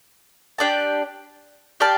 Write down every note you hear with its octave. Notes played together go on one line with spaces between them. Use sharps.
D4 G4 D5 A5
G4 D5 F5 A5